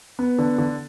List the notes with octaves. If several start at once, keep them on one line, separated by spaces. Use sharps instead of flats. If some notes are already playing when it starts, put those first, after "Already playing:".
B3
D3
D3